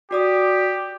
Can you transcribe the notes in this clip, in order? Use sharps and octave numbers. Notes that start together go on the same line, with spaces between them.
F#4 G4 D5 D#6